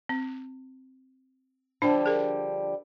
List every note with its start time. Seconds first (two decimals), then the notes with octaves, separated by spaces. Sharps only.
0.09 C4
1.82 D3 F3 G3 D4
2.06 G#4 A#4